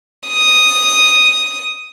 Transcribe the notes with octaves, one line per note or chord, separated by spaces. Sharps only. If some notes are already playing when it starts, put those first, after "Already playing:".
D#6